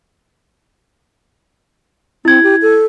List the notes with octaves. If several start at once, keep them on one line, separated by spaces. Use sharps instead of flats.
C4 E4 G#6
G4
A4